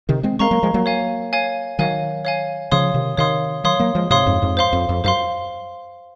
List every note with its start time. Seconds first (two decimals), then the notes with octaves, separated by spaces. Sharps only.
0.09 C3 D#3
0.23 G#3 C4
0.39 G#3 C4 A#4 F5 A#5 C#6
0.51 F#3 A#3
0.63 F3 G#3
0.74 F#3 A#3
0.86 C#5 F5 G#5
1.33 C#5 F5 G#5
1.79 D#3 F#3 C#5 F5 G#5
2.25 C#5 F5 G#5
2.71 C#3 F3 C#5 F5 C6 D#6
2.94 C3 D#3
3.17 C3 D#3 C#5 F5 C6 D#6
3.64 D#3 F#3 C#5 F5 C6 D#6
3.80 F#3 A#3
3.95 F3 G#3
4.10 G#2 C3 C#5 F5 C6 D#6
4.26 F2 G#2
4.42 F2 G#2
4.57 C5 F5 C6
4.73 F2
4.89 F2
5.04 F#2 C5 F5 C6